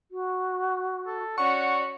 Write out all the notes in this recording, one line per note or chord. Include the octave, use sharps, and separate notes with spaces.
F#4
A4
C#4 F#4 D5 F#5 C#6